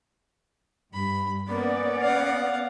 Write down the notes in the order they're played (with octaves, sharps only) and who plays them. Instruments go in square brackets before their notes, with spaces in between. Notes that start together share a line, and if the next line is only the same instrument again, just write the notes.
[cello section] G2 [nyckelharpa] B5
[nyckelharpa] A#3 [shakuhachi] B3 [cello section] C#4 D5
[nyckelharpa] F5 F#5